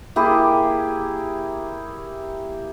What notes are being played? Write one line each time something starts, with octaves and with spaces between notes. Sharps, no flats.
A#3 E4 G4 G#4